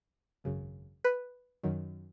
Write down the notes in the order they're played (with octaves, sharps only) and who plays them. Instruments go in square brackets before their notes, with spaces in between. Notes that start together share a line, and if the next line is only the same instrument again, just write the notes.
[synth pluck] G#1 F#2 C#3
B4
F#2 D#3 F#3